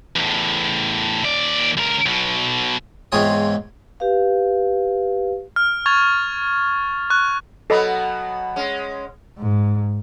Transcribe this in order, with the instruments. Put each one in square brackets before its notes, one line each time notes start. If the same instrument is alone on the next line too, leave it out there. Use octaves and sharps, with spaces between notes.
[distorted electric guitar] E2 A2
D#2 D5
C#2 A#4
B1 B2
[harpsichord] E2 G#2 C4 F4 C#5 D#6
[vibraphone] G4 B4 F5
[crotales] F6
C#6 G#6 A6 F7
C#6 F#6
[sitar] B2 F#3 B3 [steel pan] A4 D#5 B5
[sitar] G#3 C#4
[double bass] G#2